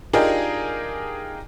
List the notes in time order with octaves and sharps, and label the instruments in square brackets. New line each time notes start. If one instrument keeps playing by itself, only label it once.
[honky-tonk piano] D4 D#4 F4 G4 G#4 A#4